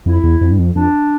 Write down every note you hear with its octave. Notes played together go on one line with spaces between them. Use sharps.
F2 E4
E2
F2
G2
F2
F2 D4